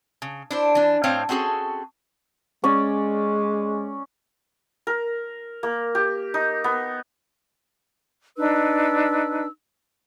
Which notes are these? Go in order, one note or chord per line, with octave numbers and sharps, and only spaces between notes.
C#3
D4 E4 C5
E3 D4
A2 C4 C5 C#5 F5
C4 C#4 F#4 G#4 A4
G#3 C#4 D5
A#4
A#3
G4
D#4
B3
D4 D#4 B4 E6